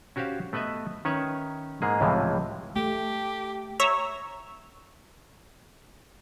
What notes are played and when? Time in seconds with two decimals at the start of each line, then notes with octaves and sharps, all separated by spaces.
0.16 C#4 F#4 G4 C5 F5
0.53 A3 B3 B4 D#5 E5
1.05 D#3 C#4 B4 C#5 E5
1.82 G#2 G#3 A#3 G#4
2.01 C#2 A2 C3 E3 F3 G#3
2.76 A3 G4
3.80 C#5 E5 A#5